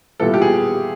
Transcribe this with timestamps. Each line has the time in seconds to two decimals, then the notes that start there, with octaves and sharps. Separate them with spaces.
0.20 A#2 G3 B3 E4 A4
0.34 G4
0.42 G#4